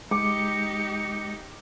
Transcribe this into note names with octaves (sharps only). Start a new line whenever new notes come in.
G#3 D#4 G4 D6 C#7